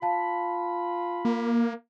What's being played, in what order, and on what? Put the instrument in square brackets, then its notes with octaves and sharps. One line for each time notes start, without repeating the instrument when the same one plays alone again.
[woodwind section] F4 B5 [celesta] F5 A5
[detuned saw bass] A#3